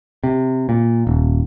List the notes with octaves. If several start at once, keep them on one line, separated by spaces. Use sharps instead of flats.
C3
A#2
D#1